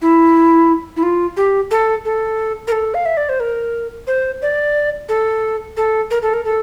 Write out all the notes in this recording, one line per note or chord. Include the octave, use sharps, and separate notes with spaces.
E4
E4
F4
G4
A4
A4
A#4
A4
F5
E5
D5
C5
A#4
C5
D5
A4
A4
A#4
A4
A#4
A4